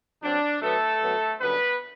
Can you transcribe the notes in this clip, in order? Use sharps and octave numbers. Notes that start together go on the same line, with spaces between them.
F#2 F#3 C4 D4
B2 F#3 A3 B3 A4
B2 F#3 B3
F#2 D3 G3 B3 B4